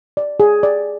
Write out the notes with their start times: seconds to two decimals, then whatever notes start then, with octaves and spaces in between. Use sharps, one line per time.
0.17 D5
0.40 G#4
0.63 D5